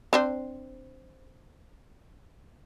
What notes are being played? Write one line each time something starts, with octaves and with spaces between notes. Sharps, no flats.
C4 D4 C5